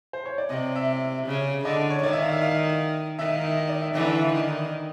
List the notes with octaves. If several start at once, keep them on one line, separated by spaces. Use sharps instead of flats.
C5
C#5
D5
C3 D#5
E5
C#3
D3 D#5
C#5
D#3 D5
E5
F5
E5
F5
D#3 E5
F5
E5
D#5
D5
E5
D3 E3 D5
E5
F5
D#3